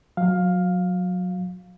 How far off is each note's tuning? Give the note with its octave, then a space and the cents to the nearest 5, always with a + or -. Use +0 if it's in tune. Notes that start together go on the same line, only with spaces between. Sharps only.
F#3 -25 F5 +10